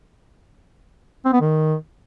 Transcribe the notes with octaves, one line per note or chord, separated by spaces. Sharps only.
C4
B3
D#3